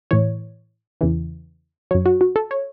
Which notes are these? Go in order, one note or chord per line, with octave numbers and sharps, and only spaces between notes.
A2 E3 C#5
E2 C#3 E3
F#2 F#3 C#5
F#4
F#4
A4
C#5